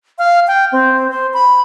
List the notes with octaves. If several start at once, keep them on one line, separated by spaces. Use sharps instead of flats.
F5
G5
C4
C5
B5